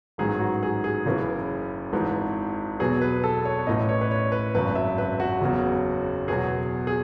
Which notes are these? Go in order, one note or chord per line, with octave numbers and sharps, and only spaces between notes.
A1 G#2 D#3 F#3 G#4
F#4
G#4
G#4
F#1 F#2 C#3 E3
G#1 G#2 E3
E2 B2 F#3 G#4
B4
A4
C#5
A1 A2 E3 D#5
C#5
B4
C#5
B4
G#1 F#2 C#3 F#3 B4
E5
B4
F#4
F#1 E2 C#3 F#3
E2 B2 F#3 G#4
G#4